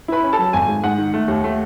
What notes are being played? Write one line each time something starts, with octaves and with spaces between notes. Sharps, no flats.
E4 B4 B5
C#4
A4 A5
F#3
G#1 G#5
G#2
G#2 F#5
D#3
A3
D#2
A3